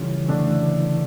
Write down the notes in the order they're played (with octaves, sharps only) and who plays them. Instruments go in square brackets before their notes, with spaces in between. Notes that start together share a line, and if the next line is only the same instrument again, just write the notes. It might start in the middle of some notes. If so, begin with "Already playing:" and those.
Already playing: [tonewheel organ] C#3 E3 [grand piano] G3 C#4 F4 A4
[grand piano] D3 A3 D4